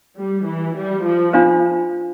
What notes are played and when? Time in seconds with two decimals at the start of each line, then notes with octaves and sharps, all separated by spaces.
0.17 G3
0.45 E3
0.76 G3
1.04 F3
1.33 D4 F4 C5 F5